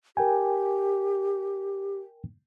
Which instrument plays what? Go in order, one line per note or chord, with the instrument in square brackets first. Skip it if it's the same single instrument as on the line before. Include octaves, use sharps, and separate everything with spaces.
[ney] G4 [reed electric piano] A#4 G5 G#5